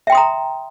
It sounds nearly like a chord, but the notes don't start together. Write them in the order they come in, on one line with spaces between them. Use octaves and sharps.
E5 G5 C6 D#6 A#5